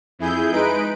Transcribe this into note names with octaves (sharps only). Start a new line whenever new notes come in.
F2 E4 G#4 G6
G#3 D#4 B4 D7